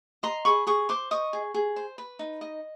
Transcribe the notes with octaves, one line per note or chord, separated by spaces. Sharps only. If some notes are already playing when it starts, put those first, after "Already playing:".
D#5 A#5 C6
G#4 B5 C#6
G#4 C#6 D#6
C5 C6 D6
D#5 C#6 D#6
G#4
G#4
C5
B4
D#4
D#5